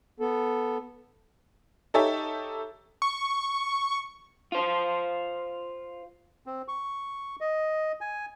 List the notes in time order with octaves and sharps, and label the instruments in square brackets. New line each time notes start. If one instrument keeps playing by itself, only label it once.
[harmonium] B3 A4
[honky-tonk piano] D#4 G4 A4 C#5 E5
[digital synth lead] C#6
[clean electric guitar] F4 C5
[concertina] C4
C#6
D#5
G#5